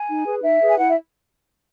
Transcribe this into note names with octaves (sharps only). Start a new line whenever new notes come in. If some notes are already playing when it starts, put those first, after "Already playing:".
Already playing: G#5
D#4
G#4 B4
D#4 E5
G#4 B4
G#5
E4 F#5
E5